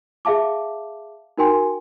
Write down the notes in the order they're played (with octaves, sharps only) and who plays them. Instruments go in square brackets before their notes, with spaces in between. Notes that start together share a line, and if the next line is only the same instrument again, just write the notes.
[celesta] G#4 E5 F5 A5 D6
D#4 F#4 A#4 G5 G#5 C6